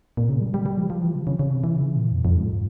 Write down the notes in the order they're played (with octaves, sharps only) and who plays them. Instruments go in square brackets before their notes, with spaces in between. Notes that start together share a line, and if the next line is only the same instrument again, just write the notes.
[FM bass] A#2
C#3
G3
G3
G3
F3
F3
E3
C#3
C#3
C#3
C3
E3
C#3
A#2
F2
F2
G#2